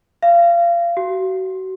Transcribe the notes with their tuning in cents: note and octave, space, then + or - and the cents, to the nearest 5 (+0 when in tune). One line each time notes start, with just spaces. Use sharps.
F5 -30
F#4 +30